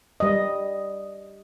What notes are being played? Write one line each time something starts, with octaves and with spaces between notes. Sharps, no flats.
G3 D#5